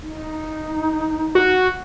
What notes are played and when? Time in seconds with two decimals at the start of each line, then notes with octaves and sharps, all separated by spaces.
0.01 D#4
1.35 F#4